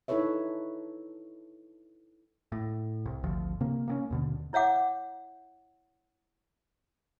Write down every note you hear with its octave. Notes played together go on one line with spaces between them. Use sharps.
D#4 E4 A4 B4 C#5 E5
A2
C2
G#1 D2 F3
C3 A#3
A#3 B3 C#4
D#2 B2 D3
E4 C#5 E5 F#5 D6